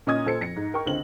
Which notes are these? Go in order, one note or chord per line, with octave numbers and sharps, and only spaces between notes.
A#2 C#4 D#5 D#6 G#6
A#2 A4 C5 C#7
F2 A#6 C#7
G#2
A#4 G5 C#6
C#2 D3 C4 F#7